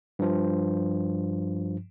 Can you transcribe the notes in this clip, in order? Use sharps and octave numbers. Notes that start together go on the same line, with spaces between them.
G2 F3